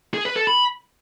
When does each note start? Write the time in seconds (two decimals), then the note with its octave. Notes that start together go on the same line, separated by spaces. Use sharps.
0.14 G#4
0.25 B4
0.36 A4
0.47 B5